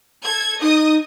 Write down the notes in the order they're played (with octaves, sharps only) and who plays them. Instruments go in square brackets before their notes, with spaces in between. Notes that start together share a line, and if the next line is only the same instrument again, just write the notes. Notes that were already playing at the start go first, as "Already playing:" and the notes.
[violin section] A4 G#6
[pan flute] D#4 [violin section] D#5 D#6